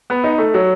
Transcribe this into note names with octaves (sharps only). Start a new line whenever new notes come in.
B3
D#4
A3
F#3